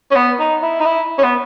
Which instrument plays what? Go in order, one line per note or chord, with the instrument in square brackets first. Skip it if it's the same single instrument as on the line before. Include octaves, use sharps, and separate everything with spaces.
[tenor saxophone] C#4
B3
D#4
E4
D#4
E4
C#4
B3